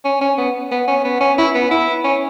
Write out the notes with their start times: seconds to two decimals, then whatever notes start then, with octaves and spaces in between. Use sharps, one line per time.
0.05 C#4
0.21 C#4
0.38 B3
0.71 B3
0.88 C#4
1.04 B3
1.21 C#4
1.38 E4
1.54 B3
1.71 E4
2.04 C#4